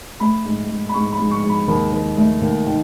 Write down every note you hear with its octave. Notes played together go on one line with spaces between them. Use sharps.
A3 B5
G#2
G#2
B5
G#2 C#6
B5
G#2
C#6
G#2
B5
D#2 B5
D#2
A3
D#2
D#3